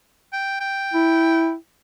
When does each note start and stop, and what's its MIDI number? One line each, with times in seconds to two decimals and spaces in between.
0.33 0.59 79
0.60 1.52 79
0.94 1.54 64